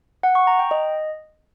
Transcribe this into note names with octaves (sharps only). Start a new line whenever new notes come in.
F#5
C#6
A#5
G5
D#5